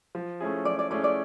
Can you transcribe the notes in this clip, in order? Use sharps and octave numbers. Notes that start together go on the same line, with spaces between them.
F3
A3 C#4 E4 G#4
F3 D5
D5
A3 C#4 E4 G#4 D5
D5